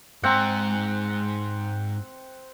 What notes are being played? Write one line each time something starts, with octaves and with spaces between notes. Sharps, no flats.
G#2 C4 F#5 A#5